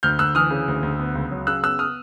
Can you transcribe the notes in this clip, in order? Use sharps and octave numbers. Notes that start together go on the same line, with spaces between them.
D2 F6 G6
D2 E6 F#6
E3 D#6 F6
C#3
D2
D2
B3
C#2
F#3
C#3 E6 F#6
B3 E6 F#6
D#6 F6